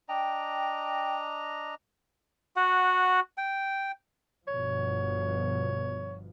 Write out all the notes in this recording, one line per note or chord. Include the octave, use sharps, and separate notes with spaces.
D4 D#5 G5 A#5
F#4 F#5
G5
G1 B2 F3 C#5